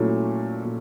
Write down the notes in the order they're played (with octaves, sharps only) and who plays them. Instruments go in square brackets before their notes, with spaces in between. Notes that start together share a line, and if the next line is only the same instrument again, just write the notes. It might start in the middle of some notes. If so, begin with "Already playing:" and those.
Already playing: [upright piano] A#2 F#3 A3 C#4 E4
A#2